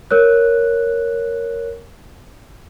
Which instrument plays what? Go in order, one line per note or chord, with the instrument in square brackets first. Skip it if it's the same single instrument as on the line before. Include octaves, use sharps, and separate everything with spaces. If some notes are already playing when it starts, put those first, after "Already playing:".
[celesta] A#4 C#5 F#6